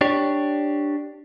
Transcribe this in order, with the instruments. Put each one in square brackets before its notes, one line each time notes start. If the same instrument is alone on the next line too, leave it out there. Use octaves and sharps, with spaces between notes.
[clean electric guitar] D4 G4 C#5